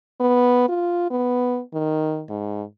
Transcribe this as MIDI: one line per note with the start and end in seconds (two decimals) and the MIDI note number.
0.20 0.68 59
0.69 1.08 65
1.10 1.61 59
1.74 2.23 51
2.30 2.63 44